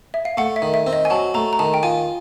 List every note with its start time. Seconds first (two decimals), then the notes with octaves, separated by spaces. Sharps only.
0.14 E5
0.25 F5
0.37 A3 F#5
0.56 E5
0.62 D#3
0.74 E5
0.87 C4
0.93 D#5
1.05 G#5
1.10 F#3 A5
1.34 A3 A#5
1.53 A#5
1.59 D#3 A5
1.74 G5
1.83 F4 G#5